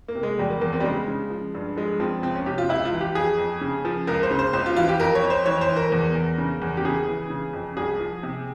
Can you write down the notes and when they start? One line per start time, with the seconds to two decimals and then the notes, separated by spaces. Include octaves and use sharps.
0.08 A#3
0.15 C3
0.23 G#3
0.39 E2 G3
0.50 A#3
0.61 E2 A#3
0.73 C4
0.80 G3
0.84 C#3 G#3
1.08 C#3
1.30 F3
1.55 G2
1.77 F3 G#3
2.00 F3 C4
2.23 C#2 C4
2.35 C#4
2.46 C3 G4
2.58 F4
2.69 C#2 E4
2.85 F4
2.92 E3
3.01 G4
3.15 F2 G#4
3.38 F2
3.61 C#3
3.85 F3
4.07 C#2 A#4
4.23 C5
4.31 C#3
4.39 C5
4.53 C#2 C5
4.66 F4
4.76 E3 F4
4.89 G4
5.00 F2 A#4
5.15 C#5
5.23 F2
5.30 C5
5.46 E3 C#5
5.61 C5
5.69 E3
5.76 A#4
5.92 E2
6.15 E2
6.38 C#3
6.62 E2
6.77 G4
6.85 C#3 G#4
7.07 E3
7.30 C#3
7.53 F2
7.77 C2 G#4
8.00 F3
8.23 C3